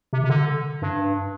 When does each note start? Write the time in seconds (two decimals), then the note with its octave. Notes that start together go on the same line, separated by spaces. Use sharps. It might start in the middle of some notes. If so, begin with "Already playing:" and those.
0.13 C3
0.24 C3
0.29 D3
0.82 G2